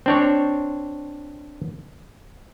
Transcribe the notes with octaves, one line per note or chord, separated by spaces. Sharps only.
C4 D4 C#5